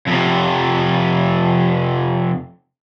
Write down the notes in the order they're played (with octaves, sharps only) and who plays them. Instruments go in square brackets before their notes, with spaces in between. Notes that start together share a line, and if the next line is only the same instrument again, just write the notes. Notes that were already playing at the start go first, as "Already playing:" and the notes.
[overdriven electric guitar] F2 C3